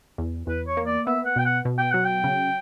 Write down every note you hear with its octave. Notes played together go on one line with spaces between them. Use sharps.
E2
E2 B4
C#5
A#3
D5
B3 E5
F#5
B2 G5
F#5
B2
G5
F#3 F#5
G5
C#3